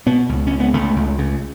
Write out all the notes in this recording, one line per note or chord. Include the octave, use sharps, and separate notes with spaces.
B2 B3
C#2
C#2 C#4
B3
C#2 A3
C#2
C#3